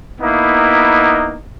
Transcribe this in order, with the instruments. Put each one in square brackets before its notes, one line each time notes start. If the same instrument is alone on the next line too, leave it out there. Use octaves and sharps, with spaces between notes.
[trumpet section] A#3 B3 D#4 E4